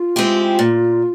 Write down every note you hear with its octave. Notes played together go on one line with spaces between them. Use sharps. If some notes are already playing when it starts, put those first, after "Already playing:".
Already playing: F4
G#3 C4 E4 G4
A#2